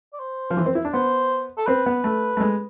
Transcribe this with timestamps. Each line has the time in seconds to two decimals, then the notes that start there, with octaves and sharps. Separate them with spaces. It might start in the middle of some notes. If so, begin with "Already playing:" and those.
0.13 D5
0.20 C5
0.51 F3
0.57 E3
0.66 C4
0.75 E4
0.85 D4
0.94 B3 C5
1.58 A4
1.67 C4 B4
1.86 B3
2.04 A3
2.37 A3
2.41 G#3